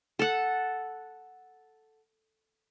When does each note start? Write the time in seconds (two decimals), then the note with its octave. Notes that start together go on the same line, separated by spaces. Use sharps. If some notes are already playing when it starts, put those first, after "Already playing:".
0.19 A4 F#5